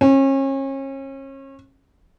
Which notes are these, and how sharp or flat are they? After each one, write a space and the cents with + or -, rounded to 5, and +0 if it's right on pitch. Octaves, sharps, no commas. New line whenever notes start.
C#4 -35